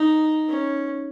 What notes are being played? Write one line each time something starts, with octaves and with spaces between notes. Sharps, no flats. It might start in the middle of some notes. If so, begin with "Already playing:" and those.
Already playing: D#4
C#4